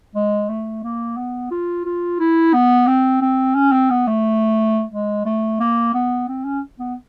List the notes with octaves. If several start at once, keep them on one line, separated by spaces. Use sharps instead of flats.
G#3
A3
A#3
B3
F4
F4
E4
B3
C4
C4
C#4
C4
B3
A3
G#3
A3
A#3
B3
C4
C#4
B3